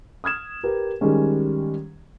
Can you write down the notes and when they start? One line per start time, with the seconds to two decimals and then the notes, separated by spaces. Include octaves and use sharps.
0.24 D#6 F6 G#6 E7
0.63 G4 A#4 B4
1.01 D#3 G3 G#3 C#4